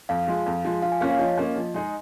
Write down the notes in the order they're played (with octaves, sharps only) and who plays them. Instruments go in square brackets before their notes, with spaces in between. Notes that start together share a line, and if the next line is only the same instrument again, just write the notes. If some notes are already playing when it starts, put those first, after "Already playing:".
[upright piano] F2 [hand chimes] F5
[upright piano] F3 G#3
F2
F3 G#3
[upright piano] F3 [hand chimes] F5
[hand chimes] G#5
[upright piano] A#3 C#4 F4 [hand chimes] F5
[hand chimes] C#5
[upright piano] F3 [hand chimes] D#5
[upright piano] A#3 C#4 F4
F3
G#3 D#4 G#4